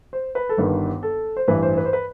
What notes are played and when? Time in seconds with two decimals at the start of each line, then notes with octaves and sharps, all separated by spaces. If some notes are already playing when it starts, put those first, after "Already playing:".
0.13 C5
0.35 B4
0.49 A4
0.57 G1 G2 D#3 B4
1.03 A4
1.37 C5
1.48 A1 G2 E3 B4
1.63 C5
1.78 B4
1.85 C5
1.93 B4